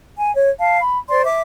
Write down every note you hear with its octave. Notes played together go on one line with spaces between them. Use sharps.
G#5
C#5
F5 A5
B5
C5 D5 C6
E5 D6